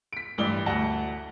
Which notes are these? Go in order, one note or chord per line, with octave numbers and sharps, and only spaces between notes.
B6 D7
A1 G2 D5 G7
D2 F#5 A5 A#6